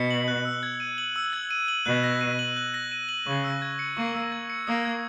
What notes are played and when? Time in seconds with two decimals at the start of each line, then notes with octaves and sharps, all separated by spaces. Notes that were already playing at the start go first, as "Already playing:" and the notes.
Already playing: B2 C#7
0.11 F#7
0.28 F#6
0.45 E6
0.63 G#6
0.80 D#7
0.98 F#7
1.16 E6
1.33 G#6
1.51 D#7
1.68 F#7
1.86 B2 F#6
2.04 A#6
2.21 D#7
2.39 F#7
2.57 F#6
2.74 A#6
2.92 D#7
3.09 F#7
3.27 C#3 C#6
3.44 E6
3.62 G#6
3.79 C#7
3.97 A#3 C#6
4.14 E6
4.32 G#6
4.50 C#7
4.67 A#3 D#6
4.85 G#6